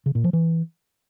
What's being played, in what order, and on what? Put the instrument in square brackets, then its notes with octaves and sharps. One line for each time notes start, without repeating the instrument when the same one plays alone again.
[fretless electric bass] C#3
A#2
F3
E3